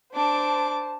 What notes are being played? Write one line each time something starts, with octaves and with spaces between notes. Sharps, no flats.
D4 C5 A5 D6